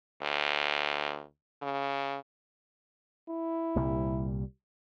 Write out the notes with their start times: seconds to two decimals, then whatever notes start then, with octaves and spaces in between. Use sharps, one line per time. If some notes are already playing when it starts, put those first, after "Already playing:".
0.22 D2
1.62 C#3
3.28 E4
3.76 C2 A#2 G3